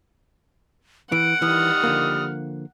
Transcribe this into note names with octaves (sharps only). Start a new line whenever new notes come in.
E3 F#5 D7
D#3 E3 G3 D#6 F6
D3 F3 A#3